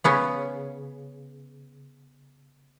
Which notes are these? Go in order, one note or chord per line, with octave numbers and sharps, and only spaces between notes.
C#3 B3 C#4